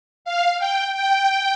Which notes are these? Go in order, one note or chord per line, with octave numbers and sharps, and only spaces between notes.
F5
G5
G5